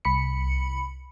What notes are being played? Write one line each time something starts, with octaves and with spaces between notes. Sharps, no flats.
C2 B5 C#7